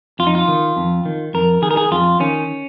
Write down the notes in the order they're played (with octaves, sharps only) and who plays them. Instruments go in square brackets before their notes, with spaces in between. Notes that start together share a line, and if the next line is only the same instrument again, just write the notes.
[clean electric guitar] F2 F4
D#4
F4
D#3
F2
D#3
F2 A#4
D#3 G#4
A#4
G#4
F2 F4
D#3 C#4